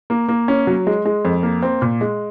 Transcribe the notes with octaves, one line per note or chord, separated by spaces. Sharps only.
A#3
A#3
C#4
F#3
G#3
G#3
F2
A#3
C4
A#2
G#3